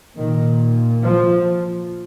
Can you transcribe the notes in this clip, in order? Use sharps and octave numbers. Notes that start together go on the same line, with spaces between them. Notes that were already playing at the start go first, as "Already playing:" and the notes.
A#2 D#3
F3